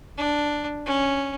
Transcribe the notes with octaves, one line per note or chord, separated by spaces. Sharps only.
D4
C#4